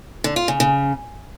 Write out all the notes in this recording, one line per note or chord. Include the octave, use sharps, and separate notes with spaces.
D3
F4
C#3
C#3